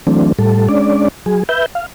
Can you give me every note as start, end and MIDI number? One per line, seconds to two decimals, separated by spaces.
0.07 0.32 52
0.07 0.32 54
0.07 0.32 57
0.07 0.32 60
0.07 0.32 62
0.39 0.68 45
0.39 0.68 55
0.39 0.68 69
0.69 1.08 56
0.69 1.08 61
0.69 1.08 62
0.69 1.08 74
1.26 1.44 54
1.26 1.44 68
1.49 1.66 71
1.49 1.66 76
1.49 1.66 91
1.75 1.86 77